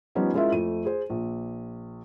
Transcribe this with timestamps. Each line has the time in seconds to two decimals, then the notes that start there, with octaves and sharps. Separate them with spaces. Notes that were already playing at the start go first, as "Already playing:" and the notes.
0.15 F3 G3 B3 C#4 D#4
0.34 G#3 C#4 E4 F4 A#4 E5
0.52 F2 A3 D#7
0.85 G#4 C5
1.10 A#1